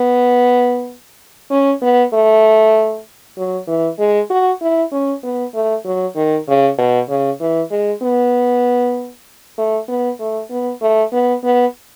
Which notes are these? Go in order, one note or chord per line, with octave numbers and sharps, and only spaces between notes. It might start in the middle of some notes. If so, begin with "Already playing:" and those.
Already playing: B3
C#4
B3
A3
F#3
E3
G#3
F#4
E4
C#4
B3
A3
F#3
D#3
C#3
B2
C#3
E3
G#3
B3
A3
B3
A3
B3
A3
B3
B3